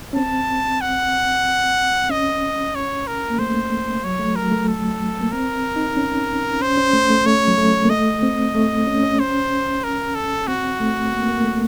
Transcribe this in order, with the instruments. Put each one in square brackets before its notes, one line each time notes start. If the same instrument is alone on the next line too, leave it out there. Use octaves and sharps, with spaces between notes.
[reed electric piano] C#4
[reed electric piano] C4 [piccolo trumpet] A5
[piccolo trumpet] F#5
[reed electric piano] C#4 [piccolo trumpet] D#5
[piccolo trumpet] C#5
A#4
[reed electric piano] A#3
[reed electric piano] A3 [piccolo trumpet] C5
[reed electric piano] F#3 [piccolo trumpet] C#5
[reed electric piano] A3
[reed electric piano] F#3 [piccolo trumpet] A#4
[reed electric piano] A3
[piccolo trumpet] A4
[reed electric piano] A#3
[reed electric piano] C4 [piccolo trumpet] A#4
[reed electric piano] D#4
C#4
[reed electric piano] C#4 [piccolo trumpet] C5
[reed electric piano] C#4
A3
A3
[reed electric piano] A3 [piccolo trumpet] C#5
[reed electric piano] F#3
A3
A#3
[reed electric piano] A3 [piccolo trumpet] D#5
[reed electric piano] C4
A3
C#4
C#4
[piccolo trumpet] C5
A#4
A4
[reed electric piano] C4 [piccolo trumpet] F#4
[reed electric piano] A3
A#3
A#3
A3